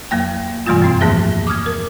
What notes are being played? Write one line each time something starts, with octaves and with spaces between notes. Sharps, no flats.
F2 F#3 A#3 G5
G2 B2 E3 G3 A3 F4
F#2 C4 C6
D#2 G#2 F3 A#3 G#4 E5
D6 D#6 F6 G#6
A#4